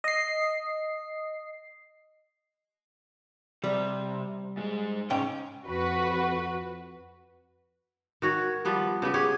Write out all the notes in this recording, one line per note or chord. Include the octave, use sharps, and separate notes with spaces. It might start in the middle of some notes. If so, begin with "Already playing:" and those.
D#5 C7
C3 G3
G#2 G#3
C#2 G#2 C#4 G5
F2 F#4 B4
D#3 F#4 C#5
F3 G3 B3
C#3 B3 G4
G4 G#4 C#5